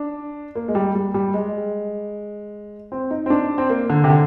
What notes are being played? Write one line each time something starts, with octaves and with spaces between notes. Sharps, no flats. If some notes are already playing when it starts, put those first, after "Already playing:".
Already playing: D4
A#3
G#3
G3
G3
G3
G#3
C4
D#4
C4
D4
C4
A#3
D3
C3
D3